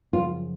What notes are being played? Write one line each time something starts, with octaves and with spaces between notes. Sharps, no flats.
F#2 C#3 F3 F4